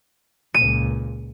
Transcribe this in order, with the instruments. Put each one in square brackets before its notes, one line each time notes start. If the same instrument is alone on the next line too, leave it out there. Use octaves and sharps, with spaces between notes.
[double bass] C#2 A#2 [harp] D#7